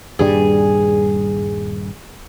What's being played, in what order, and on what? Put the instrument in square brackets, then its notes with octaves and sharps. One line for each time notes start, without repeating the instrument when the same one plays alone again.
[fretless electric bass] D#1 G2 G3 [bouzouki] G#4